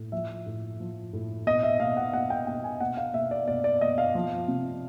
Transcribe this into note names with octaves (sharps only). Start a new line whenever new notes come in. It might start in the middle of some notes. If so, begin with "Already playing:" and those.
Already playing: A2
F3 E5
A2
F3
A2
B2 D#5
E5
B2 F5
F#5
B2 F#5
G5
B2 G5
G#5
B2 F#5
F5
B2 E5
D5
B2 D5
D5
B2 D#5
F5
F3
C3